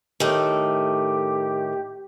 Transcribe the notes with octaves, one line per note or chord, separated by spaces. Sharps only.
A2 D#3 A3 G4